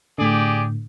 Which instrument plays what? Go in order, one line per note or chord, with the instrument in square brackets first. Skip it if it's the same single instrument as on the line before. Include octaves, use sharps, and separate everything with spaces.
[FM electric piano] A2 D3 [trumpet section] G4 G#4 D5